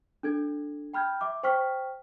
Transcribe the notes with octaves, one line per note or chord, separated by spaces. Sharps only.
D4 A4 G#6
G5 B5 F6 G6 G#6
E5 D6
C5 G5 C#6 F6 B6